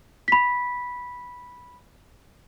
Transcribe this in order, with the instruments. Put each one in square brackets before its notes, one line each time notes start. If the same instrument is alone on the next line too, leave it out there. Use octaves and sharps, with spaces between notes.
[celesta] B5 B6